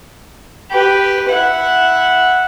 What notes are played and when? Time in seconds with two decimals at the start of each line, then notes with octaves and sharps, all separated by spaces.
0.71 G4 B4
1.29 E4 F#5